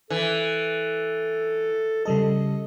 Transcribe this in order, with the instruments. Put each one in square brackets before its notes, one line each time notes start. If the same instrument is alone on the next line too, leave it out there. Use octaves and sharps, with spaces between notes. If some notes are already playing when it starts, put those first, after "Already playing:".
[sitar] E3 [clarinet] A4
[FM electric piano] C#3 G3 A4 [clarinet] D#5